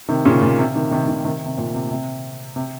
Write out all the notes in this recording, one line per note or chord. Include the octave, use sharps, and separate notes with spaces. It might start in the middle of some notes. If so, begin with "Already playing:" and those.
C3 D#3
A#2 C#3
A#2
C3
C3 D#3
C3 D#3
C3 D#3
C3 D#3
C3
A#2
C3
C3
C3